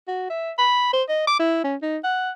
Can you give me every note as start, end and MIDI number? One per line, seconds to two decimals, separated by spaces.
0.08 0.28 66
0.30 0.52 76
0.58 0.92 83
0.93 1.03 72
1.09 1.27 75
1.27 1.39 86
1.40 1.61 64
1.64 1.76 61
1.83 1.98 63
2.04 2.31 78